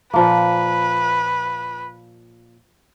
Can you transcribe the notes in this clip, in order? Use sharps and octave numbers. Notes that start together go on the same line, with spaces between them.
A#2 F3 A#3 B4